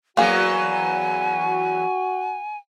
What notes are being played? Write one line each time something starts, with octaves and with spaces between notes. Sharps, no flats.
E2 E3 F#3 A#3 F#4 G#4 F#5 G#5